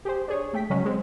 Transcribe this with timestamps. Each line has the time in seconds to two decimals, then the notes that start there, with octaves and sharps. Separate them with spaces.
0.05 G4 G#4 C5
0.28 D4 G#4 C#5
0.53 A3 G5 B6
0.70 C#3 F#3 G#3 C#4
0.85 G#3 C4